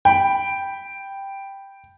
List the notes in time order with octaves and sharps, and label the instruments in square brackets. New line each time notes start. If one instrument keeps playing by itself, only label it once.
[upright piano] G5 B5